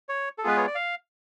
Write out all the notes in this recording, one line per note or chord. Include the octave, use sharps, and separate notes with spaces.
C#5
A4
G#3 B3 F4 G#4 B4
C#5
D5
F5